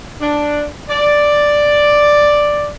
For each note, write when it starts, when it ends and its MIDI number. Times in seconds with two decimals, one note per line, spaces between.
0.21 0.65 62
0.89 2.68 74